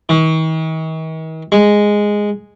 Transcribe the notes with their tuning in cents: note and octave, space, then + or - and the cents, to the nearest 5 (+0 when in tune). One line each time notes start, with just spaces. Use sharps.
D#3 +45
G#3 -5